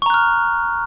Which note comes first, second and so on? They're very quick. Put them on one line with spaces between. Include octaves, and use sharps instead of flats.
C#6 A#5 F#6 F6